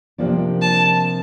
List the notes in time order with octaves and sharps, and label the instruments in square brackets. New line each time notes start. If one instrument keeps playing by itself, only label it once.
[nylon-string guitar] C3 F3 A#3 D4
[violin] A5